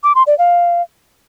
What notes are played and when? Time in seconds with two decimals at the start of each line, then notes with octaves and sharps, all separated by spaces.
0.03 D6
0.15 C6
0.27 D5
0.38 F5